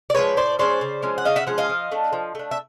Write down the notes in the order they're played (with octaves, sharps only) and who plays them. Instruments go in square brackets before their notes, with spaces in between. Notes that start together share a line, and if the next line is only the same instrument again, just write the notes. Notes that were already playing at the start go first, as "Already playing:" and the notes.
[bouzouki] D5
F3 G#3 C#4 B4 C#5
A2 C5 D5
F3 G#3 C#4 C5 D5
C#3
F3 G#3 C#4
F#5
C#3 D#5 F5
E5 F#5
F3 G#3 C#4 F#5
D#5 F5
F3
A3 D4
F3
A3 D4
E5